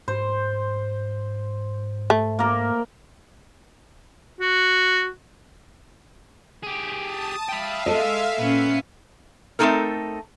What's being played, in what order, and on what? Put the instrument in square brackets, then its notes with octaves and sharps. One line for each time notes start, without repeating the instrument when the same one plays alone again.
[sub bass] G#2 [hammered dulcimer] C5
[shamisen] A3
[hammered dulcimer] A#3 A#4
[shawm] F#4
[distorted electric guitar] G4 G#4
[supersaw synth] A5 D#6
[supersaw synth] E5 F5 [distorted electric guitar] G5 B5
[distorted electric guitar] G#3 [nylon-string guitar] A4 D#5
[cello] A#2 C#4 [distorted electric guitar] B3 [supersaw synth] C7
[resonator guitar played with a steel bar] A3 C4 C#4 D#4 A4 A#4